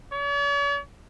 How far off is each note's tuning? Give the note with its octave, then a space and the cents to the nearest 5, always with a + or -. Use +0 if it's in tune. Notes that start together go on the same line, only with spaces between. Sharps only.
C#5 +45